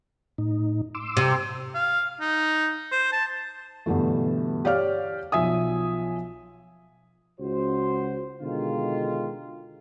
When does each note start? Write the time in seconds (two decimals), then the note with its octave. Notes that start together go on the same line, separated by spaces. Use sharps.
0.38 A2 D#4
0.95 C6 D6 E6
1.17 C3
1.75 F5
2.20 D#4
2.91 C5
3.12 A5
3.86 G2 B2 D3 E3 A3
4.65 G4 C#5 D5 F5 F6
5.32 B1 F3 E5 G#5 D#6
7.40 C#2 F#4 C5
8.41 B2 D3 D#3 G#3 F4